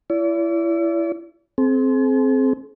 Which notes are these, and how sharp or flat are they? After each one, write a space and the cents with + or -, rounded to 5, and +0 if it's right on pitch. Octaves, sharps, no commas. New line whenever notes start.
E4 +25 D5 -40
C4 +0 G#4 +45